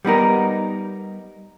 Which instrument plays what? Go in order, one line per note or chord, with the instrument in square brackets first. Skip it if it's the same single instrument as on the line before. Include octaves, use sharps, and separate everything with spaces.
[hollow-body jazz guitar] G3 B3 D#4 A#4